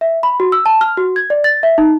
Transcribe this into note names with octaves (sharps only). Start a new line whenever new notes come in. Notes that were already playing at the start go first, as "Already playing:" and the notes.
E5
B5
F#4
E6
A5
F6
F#4
G#6
D5
A6
E5
D#4